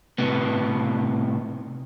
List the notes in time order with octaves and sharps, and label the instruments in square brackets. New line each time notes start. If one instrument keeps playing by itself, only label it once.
[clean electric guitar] A2 C3 B3